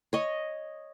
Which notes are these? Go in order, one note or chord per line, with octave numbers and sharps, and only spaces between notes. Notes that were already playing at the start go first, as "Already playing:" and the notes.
C#5 D#5